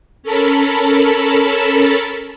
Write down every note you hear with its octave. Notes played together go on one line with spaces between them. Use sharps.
C#4 A4 A#4 A5 B5